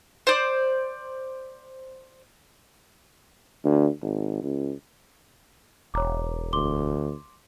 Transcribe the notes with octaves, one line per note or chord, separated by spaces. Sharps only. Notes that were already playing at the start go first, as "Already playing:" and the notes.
C5 D5
D2
G#1
C#2
E1 C#5 A#5 D6
D2 C6 D6 G7